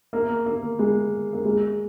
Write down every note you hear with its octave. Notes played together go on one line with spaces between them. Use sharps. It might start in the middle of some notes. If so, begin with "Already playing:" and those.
A#3
A#3
G#3
A#3
G#3